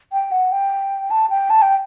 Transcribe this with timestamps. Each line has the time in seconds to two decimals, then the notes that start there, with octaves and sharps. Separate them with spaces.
0.13 G5
0.32 F#5
0.52 G5
1.11 A5
1.30 G5
1.50 A5
1.62 G5